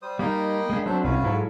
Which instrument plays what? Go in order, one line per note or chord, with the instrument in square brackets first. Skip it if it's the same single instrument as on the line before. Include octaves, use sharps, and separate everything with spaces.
[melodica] G3 C5 D#6
[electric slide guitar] G3 D#4 [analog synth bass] A#3 [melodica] D#5 G5 B5
[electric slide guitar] G#3 A#3 D4
[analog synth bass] F#3 [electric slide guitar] C4 D4 [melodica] A4 C5 E5
[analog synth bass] C2 [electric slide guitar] C3 C#4 [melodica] F4 F#4 B4
[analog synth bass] G#2 [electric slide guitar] F#3 E4 A4